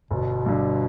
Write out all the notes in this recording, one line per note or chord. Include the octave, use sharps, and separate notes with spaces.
G1 B2
G2 D3